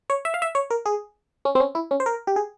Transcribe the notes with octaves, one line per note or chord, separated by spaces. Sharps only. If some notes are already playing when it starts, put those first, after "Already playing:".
C#5
E5
F5
E5
C#5
A#4
G#4
C#4
C4
C#4
E4
C#4
C5
A#4
G4
G#4